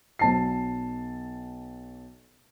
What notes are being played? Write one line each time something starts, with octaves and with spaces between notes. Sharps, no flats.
B1 A5 C7